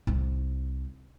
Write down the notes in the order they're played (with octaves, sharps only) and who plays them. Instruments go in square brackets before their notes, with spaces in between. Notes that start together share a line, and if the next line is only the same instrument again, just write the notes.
[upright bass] C2 D#4